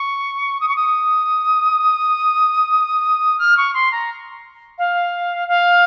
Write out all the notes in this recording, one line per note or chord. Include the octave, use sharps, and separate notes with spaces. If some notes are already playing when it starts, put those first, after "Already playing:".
Already playing: C#6
D#6
C#6
D#6
F6
C#6
C6
A#5
F5
F5